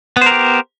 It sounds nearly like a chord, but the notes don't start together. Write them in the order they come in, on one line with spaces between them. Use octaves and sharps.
B3 C5 A#4 G4